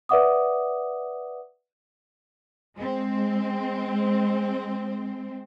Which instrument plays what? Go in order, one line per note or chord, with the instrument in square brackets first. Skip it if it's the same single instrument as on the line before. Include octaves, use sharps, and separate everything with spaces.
[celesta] B4 D5 E5 F#5 D6 D#6
[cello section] G#3 C4